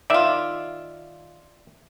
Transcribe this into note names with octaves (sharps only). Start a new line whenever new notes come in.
D#3 F4 D5 E5